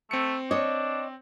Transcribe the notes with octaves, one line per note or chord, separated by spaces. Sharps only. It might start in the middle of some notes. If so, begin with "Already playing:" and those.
A3 C4 C#7
D4 C#5 D#5